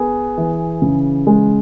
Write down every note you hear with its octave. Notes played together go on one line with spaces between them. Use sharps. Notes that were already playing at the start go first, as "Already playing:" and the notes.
Already playing: B3 G#4
E3
C#3
G#3